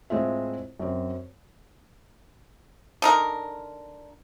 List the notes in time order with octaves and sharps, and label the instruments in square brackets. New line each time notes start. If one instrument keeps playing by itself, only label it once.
[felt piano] A2 G#3 C4 F4 E5
F#2 C4
[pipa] D3 D#4 A#4